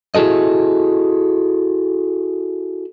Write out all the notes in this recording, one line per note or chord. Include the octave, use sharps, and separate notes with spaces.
E4 F#4 G#4 A4 D#5